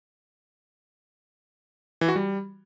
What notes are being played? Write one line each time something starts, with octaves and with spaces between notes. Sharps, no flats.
E3
F#4
G3